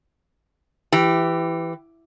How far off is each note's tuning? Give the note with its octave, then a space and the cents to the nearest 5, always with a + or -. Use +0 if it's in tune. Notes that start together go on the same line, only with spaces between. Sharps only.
E3 +15 G4 +0